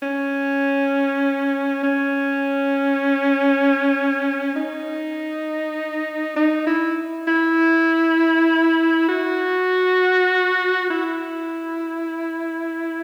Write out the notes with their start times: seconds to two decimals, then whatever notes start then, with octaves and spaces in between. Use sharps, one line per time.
0.02 C#4
1.83 C#4
4.56 D#4
6.36 D#4
6.67 E4
7.28 E4
9.09 F#4
10.90 E4